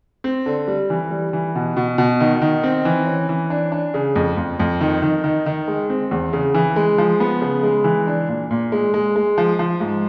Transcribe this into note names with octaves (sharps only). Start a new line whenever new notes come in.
C4
D3
G3
E3
G3
E3
B2
B2
B2
D#3
D#3
C4
E3
C#4
E3
D4
D4
C#3
F2
F2
F2
D#3
D#3
D#3
D#3
G#3
C4
E2
C#3
E3
G#3
F3
B3
C#3
G#3
E3
D4
A#2
A#2
G#3
G#3
G#3
F3
F3
G#2